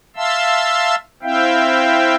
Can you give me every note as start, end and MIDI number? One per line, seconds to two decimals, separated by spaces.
0.16 0.95 76
0.16 0.95 77
0.16 0.95 81
0.16 0.95 84
0.16 0.95 88
1.23 2.16 60
1.23 2.16 64
1.23 2.16 76
1.23 2.16 77
1.23 2.16 79